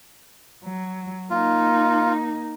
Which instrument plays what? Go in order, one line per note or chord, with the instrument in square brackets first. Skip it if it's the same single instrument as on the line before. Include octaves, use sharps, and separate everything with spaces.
[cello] F#3
[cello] A#3 D#4 [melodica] F4